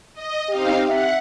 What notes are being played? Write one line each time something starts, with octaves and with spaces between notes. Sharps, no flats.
D#5
C4 D#4 G4 F5
E5 F#5